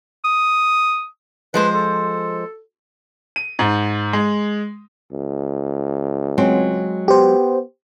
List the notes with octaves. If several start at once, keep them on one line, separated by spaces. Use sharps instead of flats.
D#6
F3 G#3 B4 C5
A4
D#7
G#2
G#3
C#2
F#3 G#3 C4
B3 G4 C5